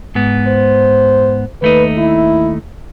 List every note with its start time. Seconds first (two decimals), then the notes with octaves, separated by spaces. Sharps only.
0.15 G#2 B3
0.47 C5
1.62 D#2 A3 D#4 B4
1.98 E4